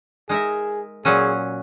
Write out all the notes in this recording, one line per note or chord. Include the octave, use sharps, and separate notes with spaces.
G#3 D#4 G#4 A#4 E5
A#2 F#3 C#4 G#4